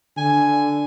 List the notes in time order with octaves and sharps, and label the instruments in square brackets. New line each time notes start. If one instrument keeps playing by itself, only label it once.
[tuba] D3 [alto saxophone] G#5